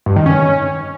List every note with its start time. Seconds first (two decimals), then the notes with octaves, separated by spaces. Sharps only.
0.06 G2
0.16 D#3
0.26 C#4